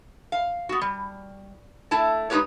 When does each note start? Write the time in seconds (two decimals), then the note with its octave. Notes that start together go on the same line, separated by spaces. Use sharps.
0.32 F5
0.69 B3 F#4
0.81 G3
1.91 A3 E4 A5
2.30 G#3 D#4 E4 G4 B4 C#5